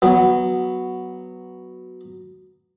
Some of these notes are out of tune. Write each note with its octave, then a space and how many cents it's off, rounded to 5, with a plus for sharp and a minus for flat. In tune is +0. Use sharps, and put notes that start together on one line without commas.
F#3 +0 B3 +0